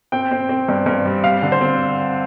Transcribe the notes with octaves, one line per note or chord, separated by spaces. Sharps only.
C4 G5
C4
C4
G2
G2
G3
G3 F5
D3
C5
C4